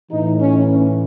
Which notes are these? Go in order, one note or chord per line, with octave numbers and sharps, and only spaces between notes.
A2 E3 D#4
C#4
C#4